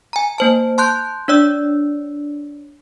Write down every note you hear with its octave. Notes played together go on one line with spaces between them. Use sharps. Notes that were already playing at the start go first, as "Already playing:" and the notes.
G#5 A#5
A#3 C5 A5
A5 C6 F#6 G6
D4 C#5 D5 E6